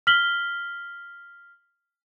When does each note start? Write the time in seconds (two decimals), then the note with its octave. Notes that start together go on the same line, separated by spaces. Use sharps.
0.07 F6 B6 F#7 G7